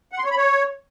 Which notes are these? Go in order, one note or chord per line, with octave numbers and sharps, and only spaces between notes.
F#5
C6
C#5
B5
C#5